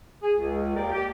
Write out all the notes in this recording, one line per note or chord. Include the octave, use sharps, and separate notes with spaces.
G#4
C#2
D#2 A#4 D5 G5
G4